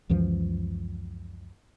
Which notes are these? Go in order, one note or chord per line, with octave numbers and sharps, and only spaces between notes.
C#2 F#2 E3 F3